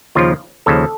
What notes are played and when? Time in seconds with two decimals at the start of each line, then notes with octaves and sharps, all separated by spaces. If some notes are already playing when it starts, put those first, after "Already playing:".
0.15 D#2 C#3 F3 F4
0.66 D#2 C#3 F3 A4